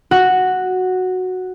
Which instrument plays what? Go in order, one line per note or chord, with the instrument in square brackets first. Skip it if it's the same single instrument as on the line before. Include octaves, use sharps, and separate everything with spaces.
[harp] F#4